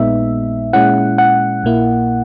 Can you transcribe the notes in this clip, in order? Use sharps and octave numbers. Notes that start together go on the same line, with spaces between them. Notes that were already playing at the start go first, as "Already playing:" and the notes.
Already playing: A#1 A#2 G#3 B3 D#4 E5
A#2 G#3 C#4 E4 F#5
F#5
A#1 A#2 A#3 E4